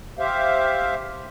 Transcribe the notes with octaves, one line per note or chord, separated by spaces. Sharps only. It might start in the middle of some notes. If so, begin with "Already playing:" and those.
G4 C5 E5 F5